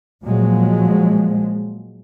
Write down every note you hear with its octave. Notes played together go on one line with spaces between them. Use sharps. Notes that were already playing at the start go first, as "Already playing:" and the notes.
A#2 F3 F#3 G#3